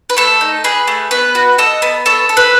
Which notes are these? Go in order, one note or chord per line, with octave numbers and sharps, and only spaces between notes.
B4
A3 A4
D#4
G#4 B4
A3
B3 B4
F#4
A4 D#5
B3
A4 C#5
A4
B4